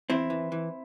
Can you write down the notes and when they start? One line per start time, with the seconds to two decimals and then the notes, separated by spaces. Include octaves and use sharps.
0.10 E2 C4 E4
0.30 E3
0.52 E3